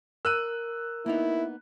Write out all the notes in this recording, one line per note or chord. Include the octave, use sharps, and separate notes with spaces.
A#4 E6 F#6 D#7
A#3 B3 D#4 E4